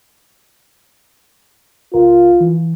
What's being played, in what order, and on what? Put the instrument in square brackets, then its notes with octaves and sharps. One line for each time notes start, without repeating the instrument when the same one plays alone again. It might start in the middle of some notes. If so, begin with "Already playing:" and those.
[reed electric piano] C#2 A#4 [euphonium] F4
[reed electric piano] E3